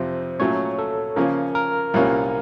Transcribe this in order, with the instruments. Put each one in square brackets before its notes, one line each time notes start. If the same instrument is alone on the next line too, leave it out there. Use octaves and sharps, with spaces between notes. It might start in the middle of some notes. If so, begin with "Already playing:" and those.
Already playing: [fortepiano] F2 C3 F3 [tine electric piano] C5
[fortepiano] A#2 F#3 A3 C#4 [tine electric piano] C#5
[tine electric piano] A4
[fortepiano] C#3 F3 A#3 C#4 [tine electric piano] A#4
[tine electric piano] A#4
[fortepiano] C2 A#2 G3 A#3 C#4